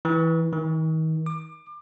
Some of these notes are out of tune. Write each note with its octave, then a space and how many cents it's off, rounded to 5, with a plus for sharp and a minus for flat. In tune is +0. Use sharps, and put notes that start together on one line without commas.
E3 -10
D#3 +35
D6 +30